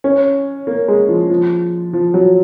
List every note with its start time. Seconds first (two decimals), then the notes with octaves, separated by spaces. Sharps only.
0.04 C#4
0.67 A#3
0.88 G#3
1.09 F3
1.30 F3
1.93 F3
2.14 F#3